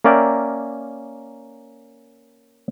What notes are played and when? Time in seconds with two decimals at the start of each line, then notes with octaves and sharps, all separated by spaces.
0.04 A#3 C#4 A#4 D5 E5 G5